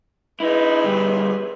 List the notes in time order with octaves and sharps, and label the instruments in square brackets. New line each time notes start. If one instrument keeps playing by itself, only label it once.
[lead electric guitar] D#4 E4 [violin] G#4 B4
[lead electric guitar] D2 G3